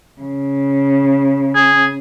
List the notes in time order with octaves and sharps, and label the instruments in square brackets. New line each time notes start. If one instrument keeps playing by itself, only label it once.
[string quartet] C#3
[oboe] G#4